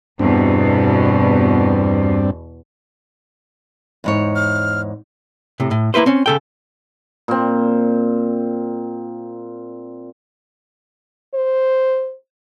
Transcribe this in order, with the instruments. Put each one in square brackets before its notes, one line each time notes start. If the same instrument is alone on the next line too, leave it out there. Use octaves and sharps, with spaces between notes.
[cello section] E2 B2 [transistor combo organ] G2 C4 D4
[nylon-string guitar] E2 G#2 C#5
[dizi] F6
[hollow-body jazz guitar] A2 C3
A2
A#3 E4 B4 C5
C4 C#4
C#3 A4 G5
[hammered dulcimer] A#2 C4
[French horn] C5